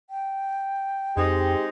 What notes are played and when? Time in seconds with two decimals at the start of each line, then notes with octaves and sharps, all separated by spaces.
0.10 G5
1.17 F2 G#3 C4 D#4 G4